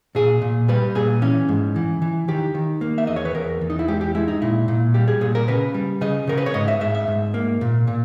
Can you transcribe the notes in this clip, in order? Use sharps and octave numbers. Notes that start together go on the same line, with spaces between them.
A#2 G#4
A#2
G3 B4
A#2 G#4
E3 C#4
G#2
E3
E3
D#3 G4
D#3
A#3
E5
E2 D#5
C#5
B4
E2 A#4
E2
D#4
E4
G#3 G4
G4
G#3 E4
D#4
A#2 E4
A#2
G3 G4
G#4
A#2 G#4
A#4
C#3 B4
G3
C#3 D#5
C#3 A#4
B4
C#5
G#2 D#5
E5
G#2 E5
E5
G#2
A#3
A#2
A#2